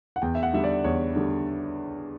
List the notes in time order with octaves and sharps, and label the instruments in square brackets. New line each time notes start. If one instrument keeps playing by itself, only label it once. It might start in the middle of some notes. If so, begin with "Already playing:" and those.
[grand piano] F#5
E2 G5
E5
F#5
D3 G3 E5
D5
E2 C#5
D3 G3